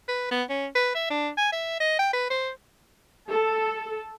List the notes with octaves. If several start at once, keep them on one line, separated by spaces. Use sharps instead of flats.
B4
B3
C#4
B4
E5
D4
G#5
E5
D#5
G5
B4
C5
A4